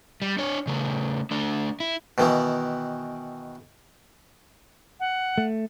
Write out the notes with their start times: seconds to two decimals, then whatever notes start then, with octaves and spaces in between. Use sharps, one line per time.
0.22 G3
0.38 D4 C#5
0.67 C#3 A3
1.31 A3 D4
1.80 E4
2.18 B2 D#3 E3
5.00 F#5
5.38 A3